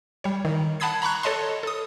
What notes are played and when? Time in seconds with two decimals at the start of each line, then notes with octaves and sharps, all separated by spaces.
0.24 G3 C#5
0.45 D#3
0.80 F#5 A5 B5 D#6 G#6 C7
1.02 A#5 B5 C#6 F#6
1.23 A4 C#5 D#5 A5 C6
1.63 A4 D#6